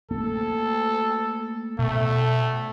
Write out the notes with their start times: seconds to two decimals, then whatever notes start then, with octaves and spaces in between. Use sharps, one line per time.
0.11 A3 A#3 A4
1.79 B2 A3